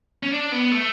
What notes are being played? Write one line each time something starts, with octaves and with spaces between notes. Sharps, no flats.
C#4
D4
B3
A3